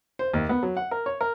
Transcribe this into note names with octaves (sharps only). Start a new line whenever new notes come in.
C5
D#2
B3
F#3
F#5
A#4
C#5
A#4